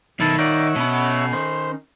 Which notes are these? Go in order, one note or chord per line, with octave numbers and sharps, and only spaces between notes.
B1 D#3 E4 A4
D#4 C#5 D5 E5 F#5
B2 C#4 B5
D#3 C5